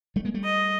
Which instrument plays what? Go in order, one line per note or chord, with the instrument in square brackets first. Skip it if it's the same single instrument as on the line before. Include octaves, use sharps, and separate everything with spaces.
[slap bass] G3 A3
G#3 A#3
G3 A3
[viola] D#5